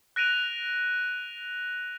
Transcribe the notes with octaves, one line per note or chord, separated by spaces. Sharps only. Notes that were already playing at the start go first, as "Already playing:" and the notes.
F#6 A#6 D7 D#7 F7